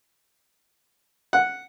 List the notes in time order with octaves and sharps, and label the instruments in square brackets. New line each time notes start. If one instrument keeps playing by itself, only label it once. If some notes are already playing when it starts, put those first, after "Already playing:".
[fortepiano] F#5